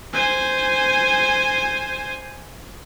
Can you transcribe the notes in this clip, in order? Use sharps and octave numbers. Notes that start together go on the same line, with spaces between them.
C5 G#5